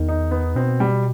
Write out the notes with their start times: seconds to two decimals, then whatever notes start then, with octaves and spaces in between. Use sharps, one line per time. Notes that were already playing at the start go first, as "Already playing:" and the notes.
Already playing: E2 D#3
0.09 D#4
0.31 B3
0.56 B2 C4
0.80 G3